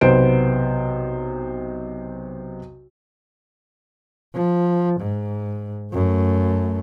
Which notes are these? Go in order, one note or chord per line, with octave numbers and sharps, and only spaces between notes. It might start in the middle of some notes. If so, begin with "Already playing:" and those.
B1 C3 B3 C5 D7
F3
G#2
F#2 A3